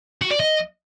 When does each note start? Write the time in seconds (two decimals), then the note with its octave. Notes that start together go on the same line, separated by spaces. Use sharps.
0.22 F#4
0.31 D5
0.40 D#5